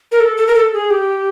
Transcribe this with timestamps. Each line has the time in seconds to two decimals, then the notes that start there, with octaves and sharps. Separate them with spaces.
0.12 A#4
0.20 A4
0.37 A4
0.47 A#4
0.55 A4
0.74 G#4
0.90 G4